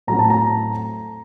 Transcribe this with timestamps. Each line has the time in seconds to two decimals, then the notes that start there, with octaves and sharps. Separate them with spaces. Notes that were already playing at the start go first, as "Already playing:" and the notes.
0.07 A2 F#3 A3 C4 A#5
0.19 A5
0.30 A#5